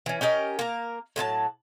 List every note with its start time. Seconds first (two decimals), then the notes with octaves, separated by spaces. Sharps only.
0.06 E3 C#4
0.21 C#4 G4 A#4 D#5
0.59 A#3 A#4
1.16 A2 F#3 E4 A5